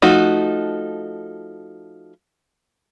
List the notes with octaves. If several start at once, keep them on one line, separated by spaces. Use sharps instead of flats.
F3 A3 D#4 F#4